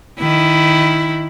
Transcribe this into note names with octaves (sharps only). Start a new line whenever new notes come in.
D#3 E4